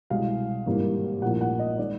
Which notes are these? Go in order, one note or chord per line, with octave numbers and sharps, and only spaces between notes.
C2 B2 G#3 F5
G#1 G2 E3 G3 A#3
A#1 A2 F3 A#3 F#5
F#5
D#5
D#3 G#3 D5